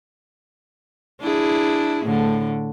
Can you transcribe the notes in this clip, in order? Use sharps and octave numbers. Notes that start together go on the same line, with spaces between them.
D4 E4 G#4
A2 D3